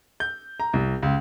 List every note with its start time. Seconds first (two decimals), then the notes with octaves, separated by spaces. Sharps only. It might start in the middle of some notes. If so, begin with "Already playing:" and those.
0.20 G6
0.60 A#5
0.73 C2
1.03 C#2